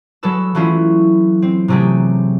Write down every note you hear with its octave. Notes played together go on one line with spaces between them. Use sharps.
F#3 G#3 A4 B4 E6
E3 F#3 A3 C#4 E4 F4
C4
C3 F#3 A3 G4 G#4